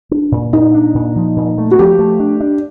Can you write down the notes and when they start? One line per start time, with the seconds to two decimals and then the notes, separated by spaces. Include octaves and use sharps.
0.11 D4
0.32 A#2
0.53 A#2 D#4
0.74 D4
0.94 A#2
1.16 F3
1.36 A#2
1.58 A3
1.71 F#4
1.79 F3 G4
1.99 A3
2.20 D4
2.40 D4